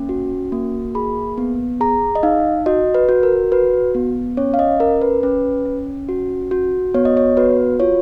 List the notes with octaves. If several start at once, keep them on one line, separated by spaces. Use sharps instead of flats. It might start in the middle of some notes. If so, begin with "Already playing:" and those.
Already playing: A#3 C#4
F#4
A#3
G#4 B5
B3
G#4 A#5
D#5
D#4 F5
F#4 D#5
B4
F#4
A#4
F#4 B4
B3
C#4 C#5
F5
D#5
C#4 A#4
B4
C#4 B4
C#4
F#4
F#4
B3 C#5
D#5
C#5
F#4 B4
F4 C#5